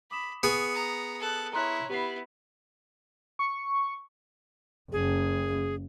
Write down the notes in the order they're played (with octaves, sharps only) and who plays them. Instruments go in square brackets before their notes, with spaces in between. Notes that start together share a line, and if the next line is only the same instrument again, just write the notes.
[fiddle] B5 [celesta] D6 D#6 E7
[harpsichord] B3 G#4 [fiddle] C#6
[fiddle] A#5
A4 F#6
[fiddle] E4 C#5 [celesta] A#5 C6 F#6
[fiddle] B3 E4 [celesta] G4 B5 C7
[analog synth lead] C#6
[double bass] F#1 [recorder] G#4